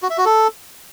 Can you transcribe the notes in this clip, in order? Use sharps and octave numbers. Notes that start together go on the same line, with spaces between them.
F#4
E5
F#4
A4